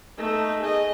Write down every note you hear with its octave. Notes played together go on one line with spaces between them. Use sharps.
A3 D#4
G#4 D#5